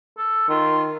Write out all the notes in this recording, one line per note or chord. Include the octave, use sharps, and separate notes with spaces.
A4
D#3 F4